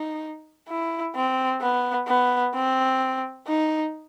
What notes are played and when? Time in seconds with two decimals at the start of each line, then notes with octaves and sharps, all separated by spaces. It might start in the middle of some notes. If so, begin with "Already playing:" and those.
Already playing: D#4
0.69 E4
1.15 C4
1.61 B3
2.08 B3
2.54 C4
3.48 D#4